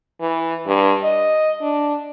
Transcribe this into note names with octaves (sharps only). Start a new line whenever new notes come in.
E3
G2
D#5
D4